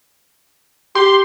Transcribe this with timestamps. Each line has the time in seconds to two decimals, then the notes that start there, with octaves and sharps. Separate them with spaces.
0.95 G4 C6